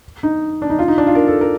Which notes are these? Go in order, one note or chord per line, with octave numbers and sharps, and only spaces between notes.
D#4
D4
D#4
F4
D#4
D4
F4
A#4
A4
A#4